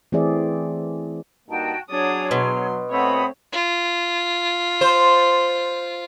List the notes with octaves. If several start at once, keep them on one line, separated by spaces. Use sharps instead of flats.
E3 A3 C4 G#4 D5 E5
G2 A#3 D#4 F#4 G5 A5
F#3 D4 G#4 C#5 D#6
B2 C6
A3 C4 C#5 F#5 B5 D#6
F4
C5